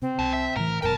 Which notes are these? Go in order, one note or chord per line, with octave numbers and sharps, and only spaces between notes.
C3 C4
C2 B2
E5
A2 C3 E3 A#4
F1 F#2 B2 A#4 G5 A5